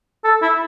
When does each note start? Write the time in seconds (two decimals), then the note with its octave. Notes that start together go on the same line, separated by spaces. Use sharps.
0.24 A4
0.42 E4